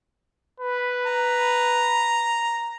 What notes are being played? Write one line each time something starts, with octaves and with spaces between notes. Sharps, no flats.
B4
A#5